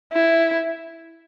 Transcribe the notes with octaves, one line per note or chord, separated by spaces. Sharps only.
E4